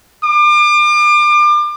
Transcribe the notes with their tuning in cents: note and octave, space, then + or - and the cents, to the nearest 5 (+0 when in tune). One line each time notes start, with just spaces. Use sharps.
D6 +35